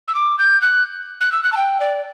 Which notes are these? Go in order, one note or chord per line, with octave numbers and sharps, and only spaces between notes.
E6
D6
G6
F#6
F#6
E6
F#6
A5
G5
D5